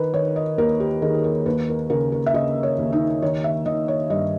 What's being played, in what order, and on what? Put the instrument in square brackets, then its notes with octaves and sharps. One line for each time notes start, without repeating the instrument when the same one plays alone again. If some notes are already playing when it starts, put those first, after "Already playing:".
Already playing: [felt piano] D#3 A#4 B4
D#3 C#5
D#5
D#2 A#4
G4
D#3 G#4
A#4
D#2 B4
A#4
C#3 A#4
A#4
E5
C#3 D#5
C#5
D#2
D#4
D#3 C#5
E5
D#3 D#5
C#5
G2 D#5